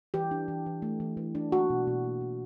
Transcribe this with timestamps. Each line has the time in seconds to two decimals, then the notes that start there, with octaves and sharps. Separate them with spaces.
0.14 E3 G4
0.31 D4
0.48 E3
0.66 E3
0.82 A3
1.00 E3
1.17 E3
1.35 D4
1.52 A#3 F#4
1.70 B2
1.87 B2
2.04 A#3
2.21 B2